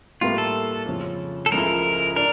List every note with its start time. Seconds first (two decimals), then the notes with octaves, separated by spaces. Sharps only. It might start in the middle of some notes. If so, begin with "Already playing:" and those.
0.21 A2 G3 A#3 F4
0.38 A4
0.86 F2 C#3 F3 C#4
1.46 A4
1.52 C#2 C#3 F3 A3 E4 A#4
2.16 D4 A#4